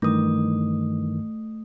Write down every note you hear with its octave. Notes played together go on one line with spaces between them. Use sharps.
G2 D#3 E3 A3 D#6